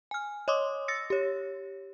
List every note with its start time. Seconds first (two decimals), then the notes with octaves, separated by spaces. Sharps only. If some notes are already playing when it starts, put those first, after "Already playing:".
0.11 G#5 F6
0.48 C#5 D#5 C6 D6 D#6
0.88 E6 A6 A#6 C#7
1.10 G4 C#5